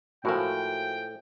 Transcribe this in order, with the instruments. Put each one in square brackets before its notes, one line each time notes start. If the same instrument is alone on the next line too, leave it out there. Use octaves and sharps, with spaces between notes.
[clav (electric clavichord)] A2 [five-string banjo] F3 G#3 [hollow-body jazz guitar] F#4 A#4 F5 [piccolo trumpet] G5